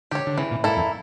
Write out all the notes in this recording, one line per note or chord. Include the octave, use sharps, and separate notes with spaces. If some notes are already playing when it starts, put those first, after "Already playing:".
D3 G4 C#5
D3
C#3 E3
A#2
A2 A#3 E4 A4
F2